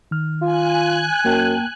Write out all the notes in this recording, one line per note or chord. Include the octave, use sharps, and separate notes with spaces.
D#3 F6
F4 G#5 F#6
F#2 A#3 G5 A5